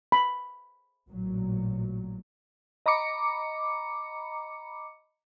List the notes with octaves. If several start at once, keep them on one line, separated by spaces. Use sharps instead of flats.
B5
A1 A#2 F#3
D#5 A#5 B5 D6 C#7